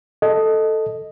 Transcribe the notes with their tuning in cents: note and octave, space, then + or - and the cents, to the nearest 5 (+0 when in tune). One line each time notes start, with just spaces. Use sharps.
A4 +0 D#5 +0